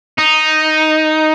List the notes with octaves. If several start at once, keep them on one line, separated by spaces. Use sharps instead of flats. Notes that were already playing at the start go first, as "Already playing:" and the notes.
D#4